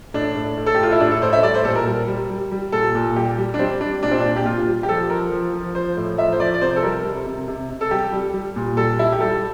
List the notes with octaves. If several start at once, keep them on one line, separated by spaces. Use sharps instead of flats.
A2 D4
A2
A2
A4
G4
A2 F4
E4
A2 D4
A4
A2 C5
E5
G3 D5
C5
A#2 A4
A#4
G3
G3
G3
G3
A#2 A4
A#2
G3 G4
G3
D4
G3 C4
G3 D4
A#2 D4
C4
D4
A#2
G4
A#2 F4
G3
G4
F3 A4
F3 A#4
F3
F3
F3 C5
A2
F3 E5
C5
F3 D5
D5
C3 C5
A4
G3 A#4
C3
C3
C3
C3
A4
G3 G4
G3
G3
A#2
G3 A4
G3 E4
G4
G3 A4